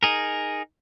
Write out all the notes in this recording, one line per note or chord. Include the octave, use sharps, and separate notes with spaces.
D#4 G#4 A#4